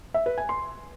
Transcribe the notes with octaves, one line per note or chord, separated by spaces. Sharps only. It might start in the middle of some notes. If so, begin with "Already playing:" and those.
E5
B4
G#5
C6